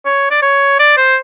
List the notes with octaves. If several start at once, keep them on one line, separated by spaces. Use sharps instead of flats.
C#5
D5
C#5
D5
C5